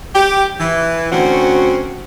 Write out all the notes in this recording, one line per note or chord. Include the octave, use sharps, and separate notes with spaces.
G4
E3
D2 C4 C#4 F#4